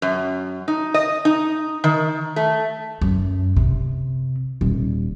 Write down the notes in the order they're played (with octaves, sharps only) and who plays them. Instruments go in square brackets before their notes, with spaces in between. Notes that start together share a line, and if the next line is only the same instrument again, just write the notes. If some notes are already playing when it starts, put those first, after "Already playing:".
[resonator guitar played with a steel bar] F#2
D#4
D#5
D#4
D#3
A3
[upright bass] F#2
C3
D#1